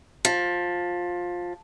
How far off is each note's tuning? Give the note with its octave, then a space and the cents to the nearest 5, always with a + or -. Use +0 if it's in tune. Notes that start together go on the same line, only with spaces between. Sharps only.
F3 +15